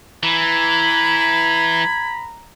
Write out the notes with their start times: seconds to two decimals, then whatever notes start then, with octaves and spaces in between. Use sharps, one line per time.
0.23 E3 A#5 B5 G#6